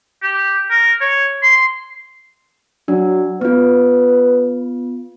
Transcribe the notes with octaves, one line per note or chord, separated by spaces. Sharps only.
G4
A#4
C#5
C6
F#3 D4
B3 F4 B4